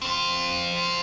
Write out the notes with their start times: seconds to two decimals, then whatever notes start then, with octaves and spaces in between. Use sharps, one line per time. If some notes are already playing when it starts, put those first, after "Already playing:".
0.02 C4 F4